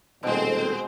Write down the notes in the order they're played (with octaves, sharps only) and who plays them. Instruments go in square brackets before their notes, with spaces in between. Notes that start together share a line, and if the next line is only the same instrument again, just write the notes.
[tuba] D#1 [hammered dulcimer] B2 G#3 [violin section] C4 C5 [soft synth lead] A4